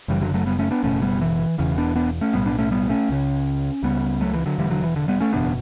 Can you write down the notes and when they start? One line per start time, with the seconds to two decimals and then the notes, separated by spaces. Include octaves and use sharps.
0.08 F#1 F#2 C#3 E3 G3
0.22 D3 F#3
0.34 F#3 A3
0.46 G3 B3
0.59 A3 C#4
0.71 B3 D4
0.83 F#1 E2 B2 A3 C#4
1.02 G3 B3
1.21 E3
1.58 E1 E2 C#3 E3
1.78 B3 D4
1.96 B3 D4
2.21 A3 C#4
2.33 B1 A2 G3 B3
2.46 B3 D4
2.58 A3 C#4
2.71 G3 B3
2.89 A3 C#4
3.09 C#2 C#3
3.83 C#2 C#3 G3 B3
4.21 F#3 A3
4.34 E3
4.46 D3 F#3
4.58 E1 D2 D3 E3 G3
4.70 D3 F#3
4.83 E3
4.96 D3
5.08 G3 B3
5.20 A3 C#4
5.33 F#1 E2 B2 B3 D4